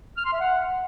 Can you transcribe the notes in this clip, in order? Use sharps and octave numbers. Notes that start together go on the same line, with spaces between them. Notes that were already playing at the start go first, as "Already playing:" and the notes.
F6
C6
E5
F#5